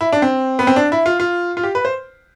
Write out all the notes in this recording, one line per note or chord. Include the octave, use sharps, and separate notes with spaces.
E4
D4
C4
B3
C4
D4
E4
F4
F4
F4
G4
B4
C5